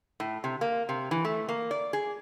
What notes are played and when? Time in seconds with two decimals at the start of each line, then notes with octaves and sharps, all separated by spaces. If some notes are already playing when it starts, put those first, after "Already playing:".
0.20 A2
0.44 C3
0.61 A#3
0.89 C3
1.11 E3
1.25 A3
1.49 A#3
1.71 D5
1.93 G#4